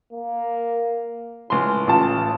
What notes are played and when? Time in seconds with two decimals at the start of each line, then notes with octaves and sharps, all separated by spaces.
0.13 A#3
1.50 C#2 A2 C6
1.87 A1 F4 A5